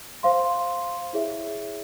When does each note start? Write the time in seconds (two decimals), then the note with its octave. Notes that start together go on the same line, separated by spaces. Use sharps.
0.23 C5 F5 C6
1.13 E4 G#4 C#5 E5